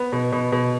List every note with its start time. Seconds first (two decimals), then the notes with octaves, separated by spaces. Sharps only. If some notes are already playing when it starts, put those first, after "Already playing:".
Already playing: B3
0.12 B2
0.32 B2
0.52 B2